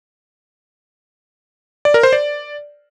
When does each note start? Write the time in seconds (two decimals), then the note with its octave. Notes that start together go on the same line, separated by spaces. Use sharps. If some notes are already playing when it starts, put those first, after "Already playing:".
1.85 D5
1.94 A#4
2.03 C5
2.13 D5